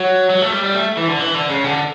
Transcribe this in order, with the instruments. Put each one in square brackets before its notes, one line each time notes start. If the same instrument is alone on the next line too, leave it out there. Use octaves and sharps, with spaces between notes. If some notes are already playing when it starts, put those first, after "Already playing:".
Already playing: [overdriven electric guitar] F#3
F#3
A3
G3
G3
A3
E3
D3
E3
D3
C#3
D3